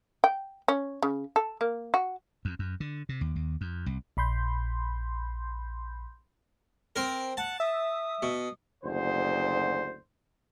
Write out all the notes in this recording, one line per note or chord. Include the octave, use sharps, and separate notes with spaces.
G5
C#4
C#3
A4
A#3
F#4
F2
F#2
D3
C3
D#2
D#2
F2
C2
A#1 B5 C6 G6
C4 A#4
F#5 A5
E5 D#6
B2
F#1 D2 C5